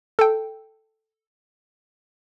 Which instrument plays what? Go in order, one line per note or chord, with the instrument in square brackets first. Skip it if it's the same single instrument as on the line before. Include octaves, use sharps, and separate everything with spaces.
[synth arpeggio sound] A4 G5